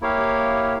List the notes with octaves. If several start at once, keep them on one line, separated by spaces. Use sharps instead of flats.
A#3 E4 G4 C#5 F5